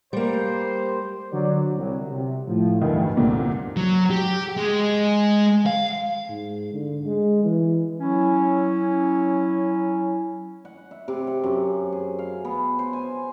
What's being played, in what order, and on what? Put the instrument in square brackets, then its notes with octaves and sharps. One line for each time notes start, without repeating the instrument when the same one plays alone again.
[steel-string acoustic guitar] G3 A#3 [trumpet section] C5
[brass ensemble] D3 F#3 D5
C2 F#3
C3
A2 F3
[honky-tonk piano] D2 D#3 [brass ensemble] G2 E3 A3
[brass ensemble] C2 [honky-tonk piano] A#2 D3 A#3
[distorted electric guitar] F#3
G4
G#3
F5
[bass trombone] G#2
D3
G#3
E3
[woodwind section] F#3 C#4 E4
[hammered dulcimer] F#5
E5
C3
F#5
F#2
G#4
F5
B3
C5
G#5